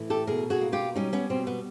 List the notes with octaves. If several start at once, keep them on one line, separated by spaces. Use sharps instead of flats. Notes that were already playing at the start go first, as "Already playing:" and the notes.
Already playing: A2 E3
G4 A4
B2 G#4 A#4
F#4 G#4
A#3
F4 G4
G3 C#4 D#4
B3 C#4
B2 C4
B3